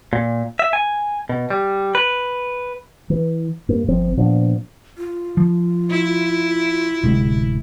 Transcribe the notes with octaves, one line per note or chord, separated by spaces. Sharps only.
A#2
E5
G#5
B2
G3
B4
E3
G2 A#3
G1 F3 C4
A#2 F3 B3 D4
F4
F3
E4
D1 C3 G#3